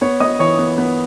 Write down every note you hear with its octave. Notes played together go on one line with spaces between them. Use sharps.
B3 C#5 C#6
B3 D#5 D#6
E3 C#5 C#6
B3
B3